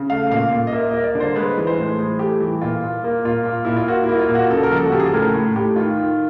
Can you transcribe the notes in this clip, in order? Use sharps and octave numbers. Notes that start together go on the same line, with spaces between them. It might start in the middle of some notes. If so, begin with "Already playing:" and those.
Already playing: C#3
A3 F5
A#2 F5
A#2
D#5
A#3 E5
D#5
A#3
D5
D3
C5
G#3 B4
E3 B4
C5
A2
E3 G#4
A3 G4
E3
A#2 F4
A#2
A#3
A#2 F4
A#2
A#2 E4
F4
A#3 F#4
E4
A#3
F4
A#2
F#4
C#3 A4
A#4
F3 A4
F#4
C#3 G4
G#4
A4
A2 A#4
A2
A2 G4
D#3 F4
D#3